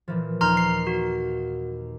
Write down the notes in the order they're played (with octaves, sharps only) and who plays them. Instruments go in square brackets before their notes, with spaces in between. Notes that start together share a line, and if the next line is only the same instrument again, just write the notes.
[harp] A#2 E3 F3
[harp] D#2 D#4 G6 [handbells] A#5 C6 F6
[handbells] C7
F#4